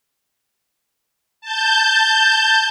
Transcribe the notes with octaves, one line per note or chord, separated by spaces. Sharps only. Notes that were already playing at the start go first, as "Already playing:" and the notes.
A5 G6